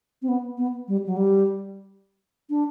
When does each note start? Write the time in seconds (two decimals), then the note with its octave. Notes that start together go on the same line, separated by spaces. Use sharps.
0.22 C4
0.28 B3
0.57 B3
0.88 G3
1.06 F#3
1.16 G3
2.50 D4